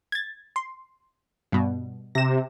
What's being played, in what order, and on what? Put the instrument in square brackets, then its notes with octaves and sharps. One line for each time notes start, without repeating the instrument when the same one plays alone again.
[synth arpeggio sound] G#6 A6
C6
G2 B2
[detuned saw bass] C3 [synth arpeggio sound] A#6 E7